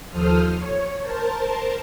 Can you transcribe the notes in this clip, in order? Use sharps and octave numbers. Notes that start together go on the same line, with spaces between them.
D#2 F3 A4 C5 D#6 F6
C#5
A#4 C5 A5